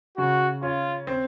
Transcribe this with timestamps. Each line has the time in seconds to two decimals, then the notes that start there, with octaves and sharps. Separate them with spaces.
0.18 C#3 F#4
0.62 C#4 F4
1.07 C4